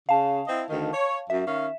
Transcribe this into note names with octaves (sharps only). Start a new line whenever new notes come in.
C#3 F5 A5
C4 E4 D#5
D2 D#3
C#5
F#2 E5
D#3 C#4 F5